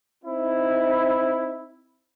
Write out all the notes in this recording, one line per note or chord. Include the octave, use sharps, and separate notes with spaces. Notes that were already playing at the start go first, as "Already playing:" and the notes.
C4 D#4 E4